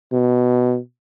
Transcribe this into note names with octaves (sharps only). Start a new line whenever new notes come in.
B2